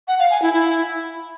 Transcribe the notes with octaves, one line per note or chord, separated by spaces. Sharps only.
F#5
F5
G#5
E4
E4